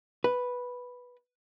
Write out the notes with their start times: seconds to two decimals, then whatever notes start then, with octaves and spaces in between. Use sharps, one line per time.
0.24 B4